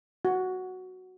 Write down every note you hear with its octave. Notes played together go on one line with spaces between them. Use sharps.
F#4